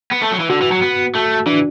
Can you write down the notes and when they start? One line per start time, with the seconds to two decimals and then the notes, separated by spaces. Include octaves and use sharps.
0.11 B3
0.22 A3
0.32 F#3
0.40 E3
0.50 D3 F#4
0.61 E3
0.72 F#3
0.82 B3
1.15 A3
1.46 E3 D4